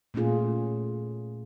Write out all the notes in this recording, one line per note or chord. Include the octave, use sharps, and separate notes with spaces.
A#2 A3 A#3 C#4 F4 G#4